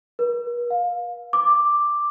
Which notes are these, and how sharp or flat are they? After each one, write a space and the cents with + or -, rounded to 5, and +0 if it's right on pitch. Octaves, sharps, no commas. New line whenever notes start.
B4 -45
F5 +25
D6 +5